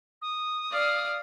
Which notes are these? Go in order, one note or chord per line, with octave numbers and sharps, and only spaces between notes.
D#6
D5 F5